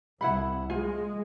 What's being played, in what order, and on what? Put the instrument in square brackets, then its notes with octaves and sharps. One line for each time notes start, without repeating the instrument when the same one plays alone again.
[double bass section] C2 [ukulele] E4 F#5 B5
[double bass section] G#3 [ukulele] F4 G#5